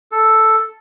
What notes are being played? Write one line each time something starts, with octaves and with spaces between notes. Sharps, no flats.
A4